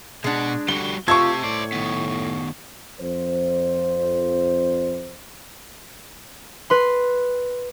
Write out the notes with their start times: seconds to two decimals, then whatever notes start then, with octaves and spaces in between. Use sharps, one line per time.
0.24 B2 G#3 D4 F#5
0.68 D3 G3 F#4 G7
1.08 A3 C4 F4 G4 D#5 C#6 G#6
1.43 A2 C5 D5
1.72 D#3 B3
2.99 F2 C5
6.70 B4 C6